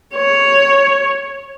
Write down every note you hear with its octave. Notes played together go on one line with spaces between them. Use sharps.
C#5